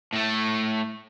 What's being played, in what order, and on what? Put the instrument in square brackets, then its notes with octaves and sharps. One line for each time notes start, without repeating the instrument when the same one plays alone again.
[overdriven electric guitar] A2 A3